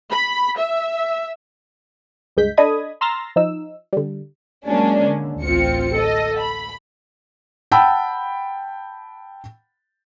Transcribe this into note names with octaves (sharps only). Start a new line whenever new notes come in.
B5
E5
C#2 G2 G#3 G6 B6
D4 A4 D#5 B5 D#6 G#6
A#5 C6 E6 F6 A6 A#6
F3 D#4 E6
D3 G3
F#3 G#3 A#3 C#4 D4
D3
A1 D2 C4 F4 C#7
A4 D#5
B5
F#5 G5 A5 B5 E6